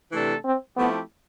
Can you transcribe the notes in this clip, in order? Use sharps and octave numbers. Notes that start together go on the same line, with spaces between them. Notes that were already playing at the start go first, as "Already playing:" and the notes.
C3 E3 A3 D4 A4
C4
F3 A3 B3 C4 E4 G4